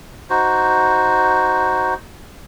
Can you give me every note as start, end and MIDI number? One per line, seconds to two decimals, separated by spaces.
0.30 1.94 63
0.30 1.94 66
0.30 1.94 72